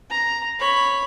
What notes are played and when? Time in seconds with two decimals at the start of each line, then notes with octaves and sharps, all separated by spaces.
0.10 A#5
0.59 C#5 B5